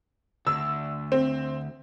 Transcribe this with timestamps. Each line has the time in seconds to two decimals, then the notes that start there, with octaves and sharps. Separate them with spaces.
0.47 D2 E6
1.12 C4